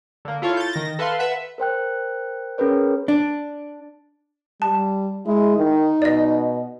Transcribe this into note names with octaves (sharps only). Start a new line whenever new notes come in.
D3 A#3
E4 F4 A4 C#5
G6 A6
D#3 A#6
A4 B4 E5 F5 C6
B4 E5 F#5
A#4 C5 G5 F#6
C#4 G#4 A#4 B4 C#5
D4
G3 A5
G#3 E4
D#3 D#4
B2 D5 D#5